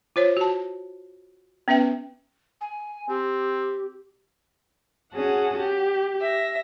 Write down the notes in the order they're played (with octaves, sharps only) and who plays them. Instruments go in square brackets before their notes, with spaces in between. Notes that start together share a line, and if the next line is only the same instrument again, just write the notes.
[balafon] F4 C5 C#5
F#4 A5
B3 C#4 B4 E5 G5
[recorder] G#5
[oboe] C4 [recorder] G4
[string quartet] C#4 F#4 G#4 F#5 A5
G4
E5 A#6